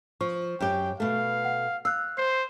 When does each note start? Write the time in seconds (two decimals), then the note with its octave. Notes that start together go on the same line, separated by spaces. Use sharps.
0.21 F3 C#6
0.60 F#2 G4 G5
1.00 B2 A3 F5
1.45 F#5
1.85 F5 E6 F#6
2.18 C5 C7